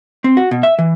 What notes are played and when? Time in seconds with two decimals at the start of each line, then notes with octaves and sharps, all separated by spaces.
0.24 C4
0.37 F#4
0.51 B2
0.63 E5
0.79 E3